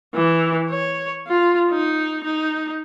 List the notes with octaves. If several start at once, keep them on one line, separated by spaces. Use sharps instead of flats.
E3
C#5
F4
D#4
D#4